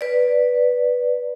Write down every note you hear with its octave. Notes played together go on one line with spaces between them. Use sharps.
B4 D5